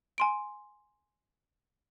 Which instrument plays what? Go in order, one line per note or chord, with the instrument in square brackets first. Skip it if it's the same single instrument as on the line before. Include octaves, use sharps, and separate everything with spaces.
[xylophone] G#5 C6 D7